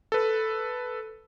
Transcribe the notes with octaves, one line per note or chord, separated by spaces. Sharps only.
A4 B4